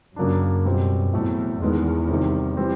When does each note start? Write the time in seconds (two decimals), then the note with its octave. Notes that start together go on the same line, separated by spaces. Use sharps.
0.16 F#2 C#3 F#3 A#3 D4
0.65 B2 G3 C4 F4
1.13 E2 A2 F#3 A3 C4
1.61 E2 D#3 G#3 B3
2.09 C3 D#3 G3
2.57 E3 G3 C4